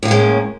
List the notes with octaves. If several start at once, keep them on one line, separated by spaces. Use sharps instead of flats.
A2 G#3 A#3 C#4